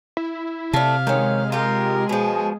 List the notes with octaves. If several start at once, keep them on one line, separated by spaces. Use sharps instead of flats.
E4
C3 A3 D5 F5
D#3 G#3 C#4
F4 G4 A#4
B2 F3 G#4